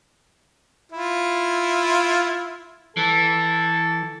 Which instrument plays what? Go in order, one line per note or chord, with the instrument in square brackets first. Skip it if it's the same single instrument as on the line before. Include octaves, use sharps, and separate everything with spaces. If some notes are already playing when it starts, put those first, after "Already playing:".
[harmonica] E4 F4
[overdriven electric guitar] E3 [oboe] A4